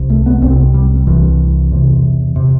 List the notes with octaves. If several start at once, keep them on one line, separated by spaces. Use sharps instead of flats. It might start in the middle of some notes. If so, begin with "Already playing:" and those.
Already playing: C2 C3
A3
B3
C2 C3 C4
G3
C2 C3 E3
E2 C3
C3